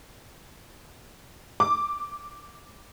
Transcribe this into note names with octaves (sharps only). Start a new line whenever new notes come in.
D6